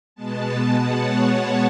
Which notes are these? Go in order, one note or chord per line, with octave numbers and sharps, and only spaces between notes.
B2 G#3 B3 A5
F#5
C#5
C#5